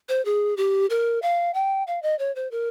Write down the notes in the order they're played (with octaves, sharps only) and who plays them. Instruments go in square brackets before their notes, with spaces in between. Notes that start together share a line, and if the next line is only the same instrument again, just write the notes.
[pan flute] C5
G#4
G4
A#4
F5
G5
F5
D#5
C#5
C5
A#4